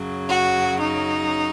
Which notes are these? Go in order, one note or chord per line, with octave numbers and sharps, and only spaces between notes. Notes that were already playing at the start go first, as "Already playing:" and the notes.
Already playing: F#2 C#3 F#3
F#4
D#4